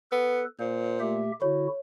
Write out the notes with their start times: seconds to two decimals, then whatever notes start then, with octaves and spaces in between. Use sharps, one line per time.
0.12 B3 A4 B4
0.59 A#2 C5
1.00 A3 G4 E5
1.42 D3 E4 F#4 C#5